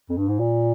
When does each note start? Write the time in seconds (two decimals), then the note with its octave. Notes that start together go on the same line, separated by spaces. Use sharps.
0.09 F2
0.17 G2
0.28 G#2
0.39 A#2